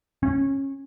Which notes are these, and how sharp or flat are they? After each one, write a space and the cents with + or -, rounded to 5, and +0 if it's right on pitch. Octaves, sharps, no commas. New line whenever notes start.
C#4 -20